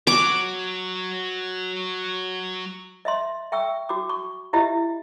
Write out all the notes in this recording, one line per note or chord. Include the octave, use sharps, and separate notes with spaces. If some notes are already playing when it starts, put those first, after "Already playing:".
F#3 F#4 D6
D#5 E5 C6
E5 G5 C#6 E6
F#4 D6
C#6
E4 F4 G4 D#5 E5